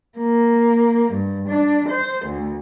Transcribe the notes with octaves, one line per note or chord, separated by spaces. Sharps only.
A#3
G2
D4
C5
D2